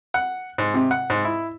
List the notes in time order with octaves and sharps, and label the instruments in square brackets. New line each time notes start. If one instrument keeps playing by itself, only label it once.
[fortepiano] F#5
G#2
C3
F#5
G#2
E4